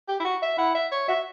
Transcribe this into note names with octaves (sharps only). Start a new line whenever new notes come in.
G4
E4
F#4
E5
E4 F#5
E5
C#5
F#4 E5